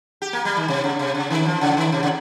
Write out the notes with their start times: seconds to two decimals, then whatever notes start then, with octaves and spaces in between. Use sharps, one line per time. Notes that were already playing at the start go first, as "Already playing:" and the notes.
0.22 G4
0.33 A#3
0.45 G3
0.57 D#3
0.68 C3
0.84 C#3
0.99 C3
1.15 C#3
1.30 D#3
1.46 F3
1.61 C#3
1.77 D#3
1.92 C3
2.03 C#3